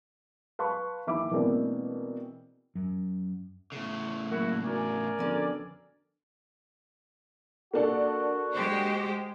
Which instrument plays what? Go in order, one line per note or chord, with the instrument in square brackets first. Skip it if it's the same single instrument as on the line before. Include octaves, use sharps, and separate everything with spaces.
[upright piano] B4 F5 A5 C6 C#6
D#2 E3 E5 B5 D6
B2 E3 G#3 A#3 C4 D4
[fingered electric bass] F#2
[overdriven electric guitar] A2 C#3
[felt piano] A#2 F#3 A#3 [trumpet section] E4 F#4
[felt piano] D4 F#4 [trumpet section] A#4 D5 G#5
[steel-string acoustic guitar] F2 D3 [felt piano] B3 C#4 F#4
[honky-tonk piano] A#3 D4 A4 [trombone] F#4
[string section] G#3 G4 C5